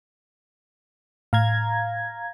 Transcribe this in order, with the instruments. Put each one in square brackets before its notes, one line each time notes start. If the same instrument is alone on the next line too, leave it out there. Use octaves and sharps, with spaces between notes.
[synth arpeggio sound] A2 [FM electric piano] F5 A#5 G#6